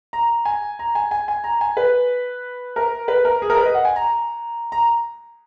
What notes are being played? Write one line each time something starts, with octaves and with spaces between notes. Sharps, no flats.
A#5
G#5
A#5
G#5
G#5
G#5
A#5
G#5
B4
A#4
B4
A#4
G#4
A#4
B4
D#5
F#5
G#5
A#5
A#5